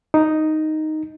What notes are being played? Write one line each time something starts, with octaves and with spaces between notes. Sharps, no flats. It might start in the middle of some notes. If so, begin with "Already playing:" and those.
D#4